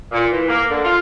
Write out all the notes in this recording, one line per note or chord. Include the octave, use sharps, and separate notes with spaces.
A#2
E3
A#3
D3
F4